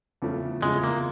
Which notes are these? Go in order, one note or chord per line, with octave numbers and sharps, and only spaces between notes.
E2 C#3 F3 A3
E2 C#3 F3 G#3 A3
A#3